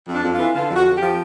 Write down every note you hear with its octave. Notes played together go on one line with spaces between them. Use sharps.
F2
D4
F2
F4
E3
D3 F4
F2
F#4
F2
G4
F3